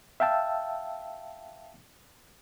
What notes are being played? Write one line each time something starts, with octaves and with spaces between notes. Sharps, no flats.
E5 F5 G5 A5 E6